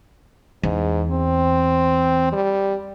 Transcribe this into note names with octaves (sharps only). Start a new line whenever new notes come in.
E2 G#2
C4
G3